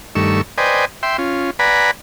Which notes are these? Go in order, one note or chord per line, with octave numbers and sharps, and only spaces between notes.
G2 D#3 A3 C#6 E6
B4 C5 D5 D#5 G5 G#5
E5 G5 C6
C#4 F4
B4 D5 F#5 G#5 A#5 B5